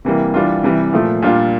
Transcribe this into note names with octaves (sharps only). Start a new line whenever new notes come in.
C3 E3 G3 A#3
E3 G3 D4 F4
C3 E3 G3
A#2 F3 A3
A#2 G3 D4 F4